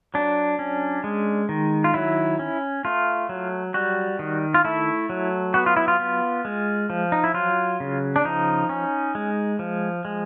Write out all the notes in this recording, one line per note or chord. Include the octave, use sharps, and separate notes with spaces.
F#3 D4
C#4
G#3
D#3
F4
F#3 E4
C#4
A3 F4
F#3
G3 F#4
D#3
F4
A3 E4
F#3
B3 F#4
F4
E4
F4
B3
G#3
F3
D#4
E4
F#3 F4
C#3
D4
F3 D#4
C#4
G#3
F3
G#3